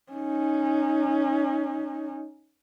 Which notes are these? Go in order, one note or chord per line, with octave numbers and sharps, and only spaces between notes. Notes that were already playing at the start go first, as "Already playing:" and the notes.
C#4 D#4